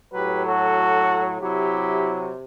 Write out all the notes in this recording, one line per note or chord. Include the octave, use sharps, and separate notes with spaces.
A2 F#3 G4 B4
F#4 A4
C3 F#3 E4 G4